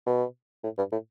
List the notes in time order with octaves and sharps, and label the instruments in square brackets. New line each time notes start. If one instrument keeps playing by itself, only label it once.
[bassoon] B2
A2
G2
A2